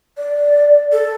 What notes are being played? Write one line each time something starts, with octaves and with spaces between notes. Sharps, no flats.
D5
A4